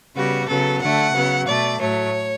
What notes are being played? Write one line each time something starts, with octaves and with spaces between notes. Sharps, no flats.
C#3 G3 B3 F#4
C#3 F#3 B3 A4
D3 A3 F#5
C#3 F#3 B3
B2 A3 D5
A2 F#3 A3 C#5